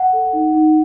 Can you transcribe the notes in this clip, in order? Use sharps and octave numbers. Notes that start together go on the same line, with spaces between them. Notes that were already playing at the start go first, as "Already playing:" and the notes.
Already playing: F#5
A4
D#4
D#4